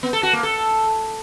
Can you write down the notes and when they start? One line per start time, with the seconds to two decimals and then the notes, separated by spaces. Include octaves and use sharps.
0.03 B3
0.13 A4
0.23 F#4
0.33 A#3
0.43 A4